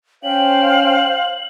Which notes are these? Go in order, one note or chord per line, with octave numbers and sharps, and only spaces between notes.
C#4 C5 F5 G5 F#7